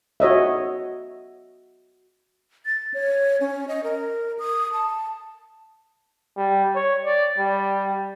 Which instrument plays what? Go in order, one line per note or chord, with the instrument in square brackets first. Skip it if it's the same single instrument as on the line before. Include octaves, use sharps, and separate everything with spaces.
[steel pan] F#4 C#5 D#5 E5
[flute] A6
C#5
C#4
D#5
A#4
D#6
A5
[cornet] G3
C#5
D5
G3